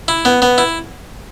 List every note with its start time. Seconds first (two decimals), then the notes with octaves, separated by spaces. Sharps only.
0.08 E4
0.25 B3
0.42 B3
0.58 E4